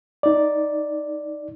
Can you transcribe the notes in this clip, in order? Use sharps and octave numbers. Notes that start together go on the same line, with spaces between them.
D#4 D5